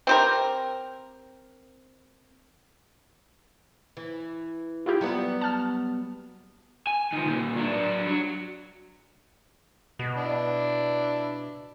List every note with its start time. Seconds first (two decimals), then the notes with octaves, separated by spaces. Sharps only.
0.07 C4 G4 A#4
3.97 E3
4.86 E4 F4 G4
5.01 F#3 G3 B3
5.41 A5 F6
6.87 G#5
7.13 D#3 F3
7.26 A#2 D#3
7.56 F#3 D4
8.07 F#3
9.99 B2
10.17 D4 E4